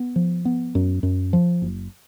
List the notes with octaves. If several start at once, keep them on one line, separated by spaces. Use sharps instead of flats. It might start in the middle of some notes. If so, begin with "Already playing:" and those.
Already playing: B3
F3
B3
F#2
F#2
F3
F#1